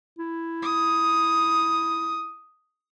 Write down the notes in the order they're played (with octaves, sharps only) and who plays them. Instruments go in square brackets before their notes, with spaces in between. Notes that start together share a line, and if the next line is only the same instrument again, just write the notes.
[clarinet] E4
[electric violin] D#6